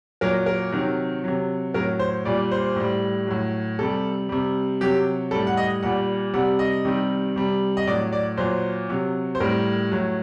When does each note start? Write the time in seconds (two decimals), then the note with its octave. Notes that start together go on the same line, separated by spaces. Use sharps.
0.21 A#2 F#3 A#4
0.46 A#4
0.72 C3 D#3 F#3
1.24 C3 F#3
1.74 A2 F#3 A#4
1.99 C5
2.25 A#2 G3 D5
2.52 C5
2.76 A2 G3
3.27 A2 F#3
3.79 C3 G3 A4
4.29 C3 G3
4.81 C3 F#3 G4
5.31 A2 G3 A4
5.47 F#5
5.57 D#5
5.83 A#2 G3 F#5
6.34 C3 G3 F#5
6.59 D#5
6.85 C3 D#3 G3
7.36 C3 G3
7.77 D#5
7.87 A2 F#3 D5
8.13 D5
8.37 A#2 F#3 C5
8.89 C3 F#3
9.35 C5
9.40 A2 G3 A#4
9.92 A2 F#3